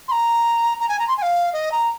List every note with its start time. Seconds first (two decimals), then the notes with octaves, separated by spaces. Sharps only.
0.08 C6
0.12 A#5
0.80 A#5
0.89 G#5
0.99 A#5
1.08 C6
1.17 G#5
1.22 F5
1.53 D#5
1.72 A#5